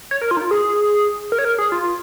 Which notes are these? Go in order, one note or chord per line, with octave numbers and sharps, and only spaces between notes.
C#5
A#4
F4
D#4
F4
G#4
A#4
C#5
A#4
G#4
F4